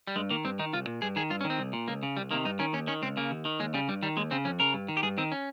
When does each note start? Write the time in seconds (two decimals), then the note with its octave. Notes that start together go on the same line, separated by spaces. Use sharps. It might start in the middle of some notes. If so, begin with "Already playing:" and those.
0.07 G3
0.16 G2 G#3
0.30 D#3 A#3
0.45 G2 C4
0.59 D#3 D#4
0.73 C2 F4
0.87 A#2
1.02 G2 G#4
1.16 D#3 G#4
1.30 G2 F4
1.41 C#4
1.44 D#3
1.50 C4
1.59 C2
1.73 A#2
1.88 C#2 A#3
2.03 C#3
2.17 C2 G3
2.31 C3 D#3 A#3
2.45 G2 D#4
2.59 D#3 C#4
2.73 D#2 C#4
2.87 D#3 C#4
3.02 C#2 C4
3.17 C#3 A#3
3.31 D#2
3.45 D#3
3.60 D#2 G#3
3.74 C#3 G3
3.88 G2 G3
4.03 D#3 G3
4.17 D#2 G#3
4.31 C#3 C4
4.45 F2 C#4
4.60 C#3 A#4
4.74 G2
4.88 D#3
4.97 G4
5.03 G2 G#4
5.18 D#3 C4
5.32 C#4